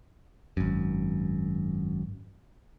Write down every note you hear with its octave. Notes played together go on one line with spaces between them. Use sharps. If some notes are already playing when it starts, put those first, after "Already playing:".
G#1 F#2